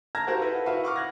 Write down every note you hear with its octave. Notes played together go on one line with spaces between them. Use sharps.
A5 A#5 F6 G#6 A#6
F#4 G4 A#4 C5 F5 F#5
E4 A4 B4 F#5
E4 F#4 B4 E5 F5
F#5 C#6 D6 F6
F#6 G#6 A#6